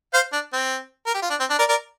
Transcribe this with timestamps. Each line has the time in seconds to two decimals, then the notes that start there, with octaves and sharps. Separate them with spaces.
0.14 C5 F5
0.33 D4
0.53 C4
1.07 A#4
1.14 G4
1.22 F4
1.30 D4
1.40 C4
1.50 D4
1.59 A#4 D5
1.69 A#4 D5